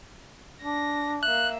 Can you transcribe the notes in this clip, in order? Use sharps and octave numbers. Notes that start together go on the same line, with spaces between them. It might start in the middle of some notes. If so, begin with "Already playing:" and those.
D4 A#6
A#3 E5 F#6